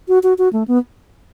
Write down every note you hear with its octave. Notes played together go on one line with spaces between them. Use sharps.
F#4
F#4
F#4
A3
B3